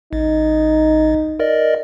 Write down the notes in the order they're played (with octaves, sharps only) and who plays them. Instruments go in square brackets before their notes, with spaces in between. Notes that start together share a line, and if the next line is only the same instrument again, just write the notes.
[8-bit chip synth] A1 [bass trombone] D#4
[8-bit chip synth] A#4 D5 D#5